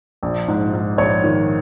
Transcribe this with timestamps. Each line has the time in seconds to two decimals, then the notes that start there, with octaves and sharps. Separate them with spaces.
0.23 A#1
0.48 G#2
0.74 G#2
0.98 A#1 C#5
1.24 D#3